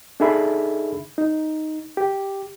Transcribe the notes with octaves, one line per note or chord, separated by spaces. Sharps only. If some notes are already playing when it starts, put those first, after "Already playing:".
D4 D#4 G#4 A4 E5 B5
D#4
G4